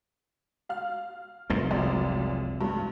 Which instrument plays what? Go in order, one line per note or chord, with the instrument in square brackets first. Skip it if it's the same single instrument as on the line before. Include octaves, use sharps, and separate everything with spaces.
[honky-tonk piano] F5 F6
[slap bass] F1 C2 G#2
[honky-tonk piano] C#2 F#2 D5
A1 G2